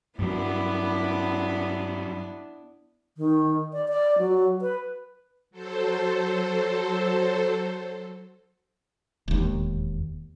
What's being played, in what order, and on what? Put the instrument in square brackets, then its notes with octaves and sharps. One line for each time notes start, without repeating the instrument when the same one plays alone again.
[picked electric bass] G2 F#3 [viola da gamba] B3 D4 E4
[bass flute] D#3
D5
D5
F#3
B4
[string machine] F#3 A4 C5
[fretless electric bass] E1 D#2